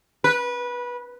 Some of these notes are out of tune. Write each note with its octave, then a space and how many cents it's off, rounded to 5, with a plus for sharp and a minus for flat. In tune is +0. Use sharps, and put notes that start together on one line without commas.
B4 -20